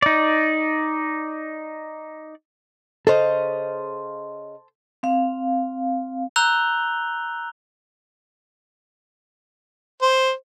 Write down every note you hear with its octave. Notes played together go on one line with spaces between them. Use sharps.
D#4 D5
C#3 A4 C5 D#5 F5
C4 F5
A#5 E6 F#6 G6 F7 G7
C5